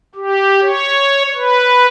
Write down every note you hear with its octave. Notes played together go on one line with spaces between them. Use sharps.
G4
C#5
B4